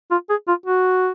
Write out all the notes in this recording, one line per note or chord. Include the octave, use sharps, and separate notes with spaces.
F4
G#4
F4
F#4